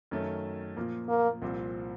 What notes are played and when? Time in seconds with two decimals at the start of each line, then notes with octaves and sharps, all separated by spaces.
0.11 F#2 D#3 A3 C#4
0.76 A#2 F3 A#3
1.09 A#3
1.42 C2 A#2 F3 C4